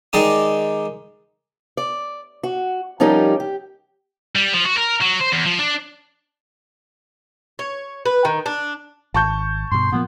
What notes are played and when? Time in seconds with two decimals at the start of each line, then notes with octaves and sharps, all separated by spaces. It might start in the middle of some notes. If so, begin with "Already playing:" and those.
0.13 D#3 G#3 D#4 D5 D#6
1.77 D5
2.43 F#4
3.00 F3 G3 C#4 D#4 G4 A#4
3.40 G4
4.36 G3
4.54 F3
4.65 F#4
4.78 A#4
5.02 F#3
5.21 C5
5.33 E2
5.46 F3
5.59 D4
7.59 C#5
8.05 B4
8.25 D#3
8.46 D4
9.14 G#1 A5 C#6 G6
9.71 G2 B2 C6
9.92 A#2 F3 A#3 B3